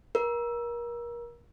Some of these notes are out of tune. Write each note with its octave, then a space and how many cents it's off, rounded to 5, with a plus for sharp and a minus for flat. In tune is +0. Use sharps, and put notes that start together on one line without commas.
A#4 +30